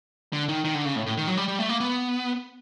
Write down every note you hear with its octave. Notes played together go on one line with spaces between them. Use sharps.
D3
D#3
D#3
D3
C#3
A2
A2
D#3
F#3
G3
G3
A3
A#3
B3